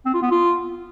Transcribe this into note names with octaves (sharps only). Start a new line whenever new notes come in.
C4
F4
B3
F4